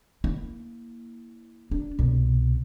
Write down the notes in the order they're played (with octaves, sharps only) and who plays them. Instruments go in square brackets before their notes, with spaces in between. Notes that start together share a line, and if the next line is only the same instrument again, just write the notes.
[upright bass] A#3 E4
D4
C2 B2